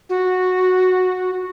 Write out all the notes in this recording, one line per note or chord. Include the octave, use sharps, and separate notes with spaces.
F#4